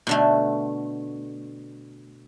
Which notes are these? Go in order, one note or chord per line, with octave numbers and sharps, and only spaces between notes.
B2 D3 A3